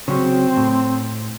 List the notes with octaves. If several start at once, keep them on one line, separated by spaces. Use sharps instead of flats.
C#3 F#3 C4 C#4
A2